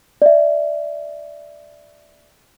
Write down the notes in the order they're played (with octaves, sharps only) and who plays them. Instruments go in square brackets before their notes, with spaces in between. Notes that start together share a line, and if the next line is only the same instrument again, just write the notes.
[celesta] D5 E5